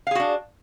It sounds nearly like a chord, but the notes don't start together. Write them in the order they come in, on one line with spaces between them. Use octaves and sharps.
F5 G#4 F#4 D4